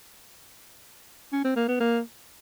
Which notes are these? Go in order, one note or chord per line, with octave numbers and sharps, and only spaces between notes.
C#4
C4
A#3
B3
A#3